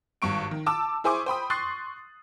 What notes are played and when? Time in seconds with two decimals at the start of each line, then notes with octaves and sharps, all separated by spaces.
0.22 G#1 G2 C#6 D7
0.51 D#3
0.66 A5 D6 E6
1.04 E4 G#4 C5 G#5 C#6 D6
1.26 C5 G5 B5 D#6
1.50 C6 C#6 D#6 F#6 A6 C7